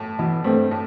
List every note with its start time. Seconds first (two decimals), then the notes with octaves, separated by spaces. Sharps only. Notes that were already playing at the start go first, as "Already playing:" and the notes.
Already playing: A2
0.19 B2 E3
0.44 G2 A3 C4
0.71 A2